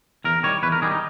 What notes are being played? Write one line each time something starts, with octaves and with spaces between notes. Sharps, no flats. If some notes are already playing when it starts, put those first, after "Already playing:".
E2 A#4
D#3 G3 C#5
E2 B4
A#4
D#3 G3 G#4
D#4